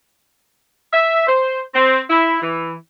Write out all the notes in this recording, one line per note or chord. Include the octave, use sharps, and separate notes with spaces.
E5
C5
C4
E4
E3